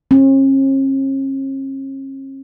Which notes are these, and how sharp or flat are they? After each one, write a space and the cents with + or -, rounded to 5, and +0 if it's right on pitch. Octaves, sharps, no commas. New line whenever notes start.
C#4 -45